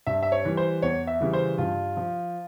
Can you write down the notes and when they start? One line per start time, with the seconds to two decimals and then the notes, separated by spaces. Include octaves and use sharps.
0.07 G2 E5
0.23 E5
0.32 C#5
0.45 E3 G3
0.57 C5
0.82 E2 C#5
1.07 E5
1.21 C#3 E3 G3
1.33 C5
1.58 G2 F4
1.97 F3